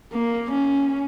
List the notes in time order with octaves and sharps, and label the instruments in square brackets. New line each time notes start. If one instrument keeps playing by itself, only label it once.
[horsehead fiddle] A#3
C#4